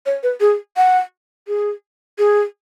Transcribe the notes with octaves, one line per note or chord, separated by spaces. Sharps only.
C#5
B4
G#4
F#5
G#4
G#4